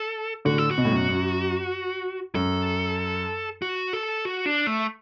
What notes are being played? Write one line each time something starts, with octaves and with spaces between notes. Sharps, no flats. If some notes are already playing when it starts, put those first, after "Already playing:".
Already playing: A4
A2 D3 F#4
A4
F#4
B2
A2
F#2 B2
F#2
F#2 A4
F#4
A4
F#4
D4
A3